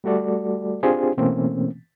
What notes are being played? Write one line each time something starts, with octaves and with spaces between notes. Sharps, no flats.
G3 A3 F#4 A4 D5
C4 D4 F4 G4 G#4 C5
B2 E3 A3 A#3 C4 C#4